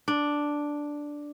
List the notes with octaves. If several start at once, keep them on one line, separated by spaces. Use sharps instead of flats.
D4